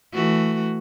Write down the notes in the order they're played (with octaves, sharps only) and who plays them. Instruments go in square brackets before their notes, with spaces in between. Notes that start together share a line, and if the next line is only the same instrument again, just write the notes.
[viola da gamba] E3 A3 F#4